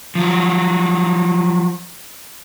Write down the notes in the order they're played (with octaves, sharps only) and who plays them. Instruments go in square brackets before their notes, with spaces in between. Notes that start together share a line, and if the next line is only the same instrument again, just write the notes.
[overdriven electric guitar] F3 F#3